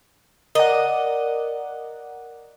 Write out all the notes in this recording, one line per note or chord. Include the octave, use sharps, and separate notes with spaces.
A#4 D5 D#5 F#5